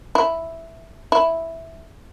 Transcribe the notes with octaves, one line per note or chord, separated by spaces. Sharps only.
E4
E4